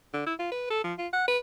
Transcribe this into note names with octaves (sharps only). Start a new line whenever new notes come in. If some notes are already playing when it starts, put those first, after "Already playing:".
D3
E4
F4
B4
A4
F3
F4
F#5
B4